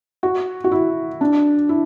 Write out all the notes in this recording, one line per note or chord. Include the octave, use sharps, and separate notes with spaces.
F#4
F#4
E4
D4
E4